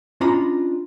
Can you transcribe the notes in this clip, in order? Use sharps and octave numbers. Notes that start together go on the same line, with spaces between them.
C#4 D4 F4 D#5 A#5 B5